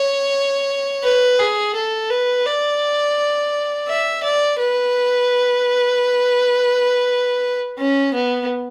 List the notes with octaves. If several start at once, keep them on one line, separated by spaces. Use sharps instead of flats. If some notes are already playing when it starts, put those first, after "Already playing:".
Already playing: C#5
B4
G#4
A4
B4
D5
E5
D5
B4
C#4
B3